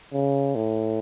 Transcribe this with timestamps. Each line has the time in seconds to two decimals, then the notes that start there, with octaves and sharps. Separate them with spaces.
0.13 C#3
0.55 A2